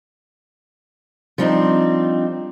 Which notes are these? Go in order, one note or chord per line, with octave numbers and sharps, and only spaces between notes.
F3 G3 C4 D4 D#4